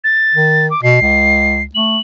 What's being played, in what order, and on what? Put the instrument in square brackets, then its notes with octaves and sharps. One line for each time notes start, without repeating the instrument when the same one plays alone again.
[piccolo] A6
[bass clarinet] D#3
[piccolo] D6
[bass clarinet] B2 [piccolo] C7
[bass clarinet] C#2
[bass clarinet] A3 [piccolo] F#7